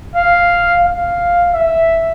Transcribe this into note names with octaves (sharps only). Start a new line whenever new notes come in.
F5
F5
E5